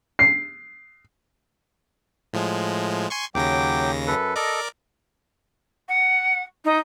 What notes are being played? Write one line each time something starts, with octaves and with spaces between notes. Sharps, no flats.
C7
A2 F3 G#3
G#5 C6 C#6
D#2 C#3 F#3 G5 D6 A#6
F#2 A4 B4
A4 A#4 D5 D#5 D6
F#5
D#4